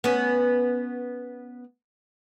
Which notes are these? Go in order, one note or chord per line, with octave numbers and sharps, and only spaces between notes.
B3 C#4